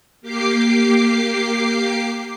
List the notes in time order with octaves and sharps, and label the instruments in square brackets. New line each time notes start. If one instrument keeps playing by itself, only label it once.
[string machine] A#3 G4 D6 C7